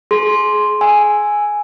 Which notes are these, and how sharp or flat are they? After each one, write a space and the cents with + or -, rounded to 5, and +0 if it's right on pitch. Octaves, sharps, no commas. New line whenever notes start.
G#4 +30 C6 +0
G#5 +0 E6 +0